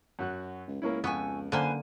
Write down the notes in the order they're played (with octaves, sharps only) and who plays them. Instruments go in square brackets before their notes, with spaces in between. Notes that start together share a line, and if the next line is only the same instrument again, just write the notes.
[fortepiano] F#2 F#4 F#6
[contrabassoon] C#2
[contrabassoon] C#2 [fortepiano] A#3 C#4 E4
[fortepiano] F2 [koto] B3 [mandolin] G#5 C#6 E6
[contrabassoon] F#1 [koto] D3 A#3 [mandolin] B4 C5 G#5